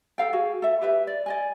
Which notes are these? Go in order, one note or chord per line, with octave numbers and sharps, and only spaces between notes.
A4 F5 G5
F#4 G#4
A4 E5
G4 B4 E5
D5
D5 D#5 G#5